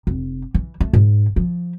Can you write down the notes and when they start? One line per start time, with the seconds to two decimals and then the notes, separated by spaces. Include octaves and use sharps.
0.07 F1
0.54 E3
0.81 A3
0.93 G#2
1.36 F3